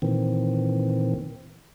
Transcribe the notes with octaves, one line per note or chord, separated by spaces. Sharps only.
A#2 D#3 E3 C4